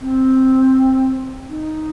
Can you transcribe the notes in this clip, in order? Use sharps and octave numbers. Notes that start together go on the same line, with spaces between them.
C4
D#4